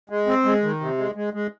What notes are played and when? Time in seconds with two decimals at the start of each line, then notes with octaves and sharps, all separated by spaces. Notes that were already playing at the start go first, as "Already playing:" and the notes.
0.10 G#3
0.27 C4
0.45 G#3
0.63 D#3
0.81 C3
0.98 G#3
1.15 G#3
1.33 G#3